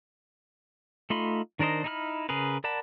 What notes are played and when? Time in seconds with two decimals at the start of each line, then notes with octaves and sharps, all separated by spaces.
1.10 A3 D#4 F4 B5 C6
1.59 D#3 D4 A#4 C5 D#5
1.84 D#4 E4 G#4 B5 F6
2.29 C#3 G#4 A#4 B4
2.64 A#4 D5 F#5 A5 B5